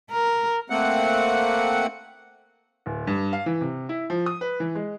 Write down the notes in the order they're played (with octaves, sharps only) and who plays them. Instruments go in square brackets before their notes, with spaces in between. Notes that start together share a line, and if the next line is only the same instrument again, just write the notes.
[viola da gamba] A#4
[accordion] A3 A#3 C4 F#5
[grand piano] D1
G2
F5
E3
C3
E4
F3
D#6
B4
E3
G#3